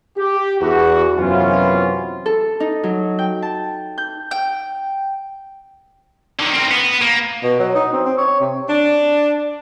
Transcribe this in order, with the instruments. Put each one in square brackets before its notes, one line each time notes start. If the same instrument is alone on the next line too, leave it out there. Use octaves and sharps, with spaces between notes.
[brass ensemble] G4
E2 F#4
F#2 C3 E3 B3 C#4 F4
[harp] A4
D#4
F#3
G5
A5
G6
[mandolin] G5
[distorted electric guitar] D3 D#3
C4 A#4
B3
A#3
[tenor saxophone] B2
F#3
D#4
C4
C4
C#5
C3
[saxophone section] D4